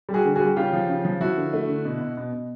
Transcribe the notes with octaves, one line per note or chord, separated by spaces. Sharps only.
G3
F#4 G#4
D3
F#4 G#4
G3
C#3 F4 G4
F3
C#3
F3
F3 E4 F#4
D3
A3
D3
B2
B2
B2
B2